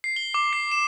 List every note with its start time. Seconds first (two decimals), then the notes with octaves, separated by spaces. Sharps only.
0.04 C7
0.16 G7
0.34 D6
0.53 C7
0.72 E7